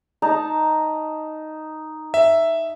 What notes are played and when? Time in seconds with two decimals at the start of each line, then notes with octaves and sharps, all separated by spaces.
0.22 D#4 A5 A#5
2.14 E5